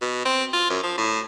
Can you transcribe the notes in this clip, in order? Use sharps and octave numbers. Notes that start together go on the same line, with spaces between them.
B2
C4
F4
F#2
F3
A2